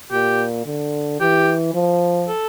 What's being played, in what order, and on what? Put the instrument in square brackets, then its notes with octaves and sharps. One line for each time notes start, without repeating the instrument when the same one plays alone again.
[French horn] A#2 [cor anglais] G4
[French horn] D3
[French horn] E3 [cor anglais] G4
[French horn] F3
[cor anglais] A4